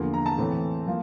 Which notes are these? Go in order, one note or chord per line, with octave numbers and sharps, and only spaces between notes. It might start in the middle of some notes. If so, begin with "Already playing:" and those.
Already playing: E2 D3 F3 A#3
A#5
A5
A2 E3 A3 C4
F3 A#3